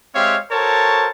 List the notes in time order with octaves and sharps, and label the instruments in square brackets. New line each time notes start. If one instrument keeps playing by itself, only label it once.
[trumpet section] G#3 C4 G4 C#5 E5 F5
F#4 A4 A#4 C5 C#5 A5